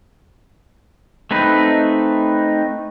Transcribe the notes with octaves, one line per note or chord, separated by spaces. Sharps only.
A3 C4 D#4 B4